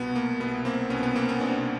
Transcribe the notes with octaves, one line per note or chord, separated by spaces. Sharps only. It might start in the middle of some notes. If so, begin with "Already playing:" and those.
Already playing: C2 B2 B3
A#3
C2 B2 B3
A#3 C4
C2 B2 B3 C#4
B3
A#3 C4
B3 C#4
C2 B2 C4 D4